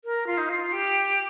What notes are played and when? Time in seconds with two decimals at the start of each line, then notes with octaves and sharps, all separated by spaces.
0.04 A#4
0.27 F4
0.37 D#4
0.49 F4
0.72 G4